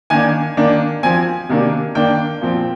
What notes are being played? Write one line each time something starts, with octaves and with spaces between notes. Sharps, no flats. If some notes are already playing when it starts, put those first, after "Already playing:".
D#3 A#3 D4 G#5
D#3 A#3 D4
F3 C4 G#5
C3 D#3 A#3 D4
D#3 A#3 D4 G5
A#2 F3 C4